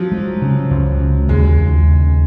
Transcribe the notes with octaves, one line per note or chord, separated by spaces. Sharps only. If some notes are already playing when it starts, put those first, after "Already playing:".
Already playing: F3 F#3
G#3
C#3
C#2
C#3
D#2 G#3
D#2
C#3